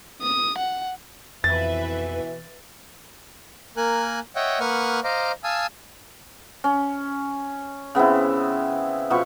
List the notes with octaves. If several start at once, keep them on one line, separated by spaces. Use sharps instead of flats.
D#6
F#5
F2 B2 E3 B4 E5 A6
A#3 A#4 G#5 F#6
C#5 D#5 E5 F#5 G5
A#3 B4 F#5 C#6 D#6 F6
C5 D#5 F5 A#5 D6
F5 G#5 A5 D#6 E6
C#4
C#3 B3 C4 E4
B2 F3 B3 C#6